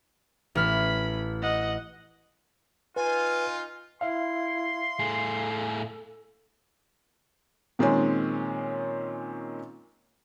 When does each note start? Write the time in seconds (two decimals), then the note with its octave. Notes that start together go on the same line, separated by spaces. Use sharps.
0.55 A1 C#4 B5 F6
1.42 D#5 F#5
2.96 D#4 F4 B4 G#5
4.01 E4 E5 F5 C6
4.99 A2 G#4 A4
7.79 A#2 D#3 G#3 C4 C#4